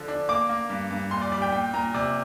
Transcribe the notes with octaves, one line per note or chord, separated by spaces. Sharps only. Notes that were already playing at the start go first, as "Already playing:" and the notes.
Already playing: D3 F3
D4
A#3 D6
A#3
G2
G2
A#2 C6
D5
G3 D5
G5
A#2 G5
A#2 A#5
C3 D5